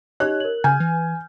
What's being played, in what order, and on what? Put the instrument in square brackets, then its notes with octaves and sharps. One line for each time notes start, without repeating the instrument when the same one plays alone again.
[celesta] D#4 G4 D#5 [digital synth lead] C#5 [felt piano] F#6
[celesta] A#4 F#7
[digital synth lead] C#3 [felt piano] G#5 [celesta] F6 G6
[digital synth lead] E3